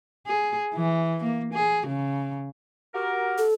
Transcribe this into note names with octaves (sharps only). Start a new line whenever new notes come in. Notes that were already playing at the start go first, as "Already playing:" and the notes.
G#4
E3
A#3
G#4
C#3
F#4 G4 A#4
A4